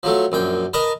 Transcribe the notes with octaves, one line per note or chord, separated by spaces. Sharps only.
F3 F#3 A3
A#1 F#2 G5
A#4 B4 D#5 A5